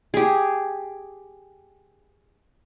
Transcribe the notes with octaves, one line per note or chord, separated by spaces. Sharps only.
G4 G#4